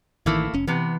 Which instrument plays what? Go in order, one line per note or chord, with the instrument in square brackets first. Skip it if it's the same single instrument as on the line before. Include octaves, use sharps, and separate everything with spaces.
[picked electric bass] A1 D#3 E3 [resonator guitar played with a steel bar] A3 A#3 E4
[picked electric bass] F1 C#4
[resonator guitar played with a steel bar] C3 B3 [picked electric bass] E3